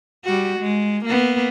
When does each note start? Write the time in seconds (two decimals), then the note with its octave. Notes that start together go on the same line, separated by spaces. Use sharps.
0.24 G3 F#4
0.60 G#3
1.05 A#3 B3